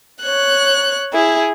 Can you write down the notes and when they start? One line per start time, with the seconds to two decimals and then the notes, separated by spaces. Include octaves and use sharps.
0.23 C#5 F#6
1.13 E4 G#4